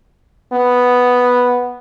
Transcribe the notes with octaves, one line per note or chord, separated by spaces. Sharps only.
B3